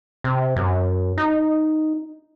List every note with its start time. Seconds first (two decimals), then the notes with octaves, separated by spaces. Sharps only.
0.24 C3
0.56 F#2
1.18 D#4